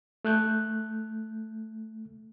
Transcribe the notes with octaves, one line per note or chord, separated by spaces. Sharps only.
A3 F#6 G6